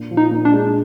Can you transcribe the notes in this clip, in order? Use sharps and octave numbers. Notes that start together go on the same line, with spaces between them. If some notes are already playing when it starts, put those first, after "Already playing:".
Already playing: A#2 D4
F3
D#4
A#2
D4
G#3